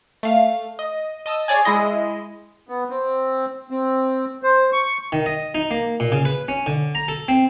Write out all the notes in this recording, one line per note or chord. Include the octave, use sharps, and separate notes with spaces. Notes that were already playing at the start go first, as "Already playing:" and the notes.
A3 F5
D#5
D#5 A5 E6
G#4 C#5 D5 G#5
G#3 E4 D#5
B3
C4
C4
C5
C#6
D#3
D#5
D#4
A#3
A#2
C#3
B4
C#4
D3
A#5
A4
C4